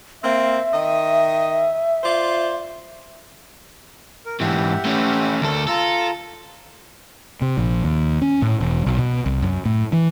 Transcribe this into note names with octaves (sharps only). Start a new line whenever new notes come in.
A#3 C4 E5
D#3 D#5
F4 C5 D5
A#4
G#2 E3 G4 E5 F#5
A3 C#4
D2 A4 A#4
F4 A4 A#5
C3
A#1
D#2
C#4
A2
E1
B1
B2
C2
F#2
A2
E3